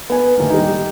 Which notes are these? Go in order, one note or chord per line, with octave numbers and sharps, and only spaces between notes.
B3 G#5
D#2 A2 A#3
G3 D#4